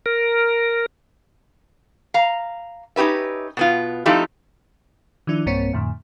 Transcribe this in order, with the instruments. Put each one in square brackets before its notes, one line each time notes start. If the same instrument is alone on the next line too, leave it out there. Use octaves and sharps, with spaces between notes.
[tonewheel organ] A#4
[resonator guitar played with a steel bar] F5 A#5
C#4 D#4 G4 B4 E5
B2 B3 F4
F3 A3 C4 D#4 E4 G4
[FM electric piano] D#3 F3 D4 E4
B1 G2 A#3 C4 C#5 C#7
F2 A2 D3